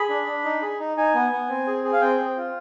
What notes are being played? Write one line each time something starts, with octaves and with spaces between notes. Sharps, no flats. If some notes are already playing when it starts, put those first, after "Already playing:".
Already playing: G#4 B5
D4
D4
D#4
G#4
D#4
D#4 G#5
B3
B3
C4
G#4
G#4
F5
C4 G5
C4
F4